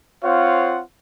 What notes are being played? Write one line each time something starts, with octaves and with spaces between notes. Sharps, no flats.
C4 F4 C5 C#5 F5 F#5